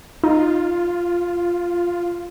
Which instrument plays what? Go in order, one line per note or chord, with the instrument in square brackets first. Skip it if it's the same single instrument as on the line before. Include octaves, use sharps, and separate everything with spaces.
[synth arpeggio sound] D#4 [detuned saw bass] F4